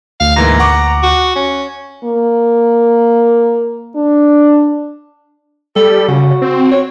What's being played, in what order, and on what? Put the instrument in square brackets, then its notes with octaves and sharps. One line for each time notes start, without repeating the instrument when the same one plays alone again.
[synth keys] D2 [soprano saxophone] F5
[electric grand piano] G#2 E3 A#3 [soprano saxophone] A#5
[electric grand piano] F#5 C#6 D6
[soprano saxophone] F#4
C#4
[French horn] A#3
D4
[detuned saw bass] G3 [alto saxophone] A4
[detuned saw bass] C#3 [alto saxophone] F#4
[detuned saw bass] C4
[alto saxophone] C#5